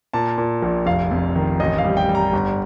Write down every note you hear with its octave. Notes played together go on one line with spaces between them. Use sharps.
A#2 A5
A#2
A#1
F1 F5
F2
D#3
A1 D#5
F5
G3
G5
G3
A#5
G1